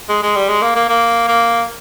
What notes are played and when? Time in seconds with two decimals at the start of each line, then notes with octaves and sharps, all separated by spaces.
0.09 G#3
0.23 G#3
0.36 G3
0.49 G#3
0.62 A#3
0.75 A#3
0.89 A#3
1.28 A#3